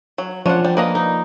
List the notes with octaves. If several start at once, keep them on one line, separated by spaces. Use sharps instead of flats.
F#3
F3 C#4 D4 F4 F#5
G3
A#3 B4 D#5 A#5
D#4